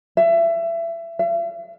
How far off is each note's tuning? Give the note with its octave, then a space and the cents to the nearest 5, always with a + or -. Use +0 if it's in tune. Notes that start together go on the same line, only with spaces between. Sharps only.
E5 +25
E5 +45